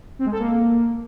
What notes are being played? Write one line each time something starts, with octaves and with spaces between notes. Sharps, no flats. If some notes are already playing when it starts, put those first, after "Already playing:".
C4
G#3
A4
A#3